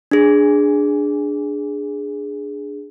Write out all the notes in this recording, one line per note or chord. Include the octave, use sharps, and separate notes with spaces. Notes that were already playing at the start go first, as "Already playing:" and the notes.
D4 G#4